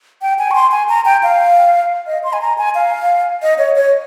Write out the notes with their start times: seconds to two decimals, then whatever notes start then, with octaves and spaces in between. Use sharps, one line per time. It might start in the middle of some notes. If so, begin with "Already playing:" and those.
0.22 G5
0.39 G#5
0.51 C#6
0.55 C6
0.71 G#5
0.89 A#5
1.05 G5
1.23 F5
2.07 D#5
2.24 C6
2.33 G#5
2.41 A#5
2.58 G#5
2.75 F5
3.42 D#5
3.58 C#5
3.76 C#5